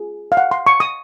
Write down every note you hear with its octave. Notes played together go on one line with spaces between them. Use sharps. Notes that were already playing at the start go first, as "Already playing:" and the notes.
Already playing: F4 G#4
F5
F#5
C6
C#6
D#6